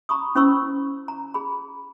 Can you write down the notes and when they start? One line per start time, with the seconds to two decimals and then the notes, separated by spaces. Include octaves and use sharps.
0.09 A#5 B5 C#6 D#6
0.35 C#4 E4 C5 B5 C#6 E6
1.08 A#5
1.34 G#4 B5